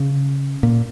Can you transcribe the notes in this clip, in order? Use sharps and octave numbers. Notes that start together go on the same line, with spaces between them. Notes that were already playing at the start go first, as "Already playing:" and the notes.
Already playing: C#3
A#2